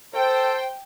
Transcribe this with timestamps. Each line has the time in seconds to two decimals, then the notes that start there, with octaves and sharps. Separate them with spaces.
0.14 A4 C5 G5